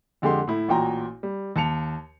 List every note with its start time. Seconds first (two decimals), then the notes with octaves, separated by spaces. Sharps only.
0.22 F2 D3 G#3 G4 C6
0.47 A2 E4
0.68 A1 A#2 F#4 G5 A#5
1.23 G3
1.56 D#2 A5 C#7 F7